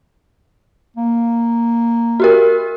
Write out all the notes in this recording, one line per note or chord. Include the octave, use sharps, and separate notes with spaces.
A#3
F#4 G4 A#4